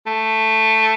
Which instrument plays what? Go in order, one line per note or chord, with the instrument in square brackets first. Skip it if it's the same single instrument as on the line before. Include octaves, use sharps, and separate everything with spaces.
[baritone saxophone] A3